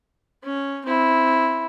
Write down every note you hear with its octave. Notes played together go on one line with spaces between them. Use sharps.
C#4
C4 E4